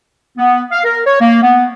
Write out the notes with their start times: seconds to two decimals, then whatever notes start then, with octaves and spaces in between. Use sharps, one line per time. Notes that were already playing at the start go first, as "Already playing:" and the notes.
0.38 B3
0.72 F5
0.85 A#4
1.06 C#5
1.21 A#3
1.43 B3